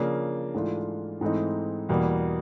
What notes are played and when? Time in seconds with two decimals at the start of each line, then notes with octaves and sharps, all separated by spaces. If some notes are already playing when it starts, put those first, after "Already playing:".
Already playing: C#3 F3 A#3 D4
0.54 G#2 E3 A3 D4 F4
1.21 G#2 E3 A3 C4 D#4
1.89 E2 B2 G3 A#3